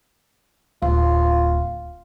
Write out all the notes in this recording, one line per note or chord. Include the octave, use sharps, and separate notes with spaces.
D1 F4